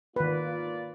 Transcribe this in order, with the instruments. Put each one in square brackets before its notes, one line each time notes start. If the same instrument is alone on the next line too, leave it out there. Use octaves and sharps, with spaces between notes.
[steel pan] D#3 B4 [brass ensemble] A#3 F4 D5